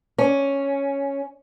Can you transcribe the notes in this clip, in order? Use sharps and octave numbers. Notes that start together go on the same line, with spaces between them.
C#4